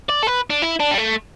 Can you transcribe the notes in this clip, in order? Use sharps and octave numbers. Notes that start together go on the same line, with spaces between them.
D5
A4
B4
D4
E4
D4
G3
A3